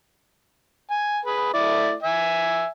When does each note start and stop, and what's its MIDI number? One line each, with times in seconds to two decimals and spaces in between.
0.90 1.19 80
1.25 1.50 68
1.25 1.50 71
1.54 1.94 57
1.54 1.94 64
1.54 1.94 74
2.03 2.69 76
2.03 2.69 80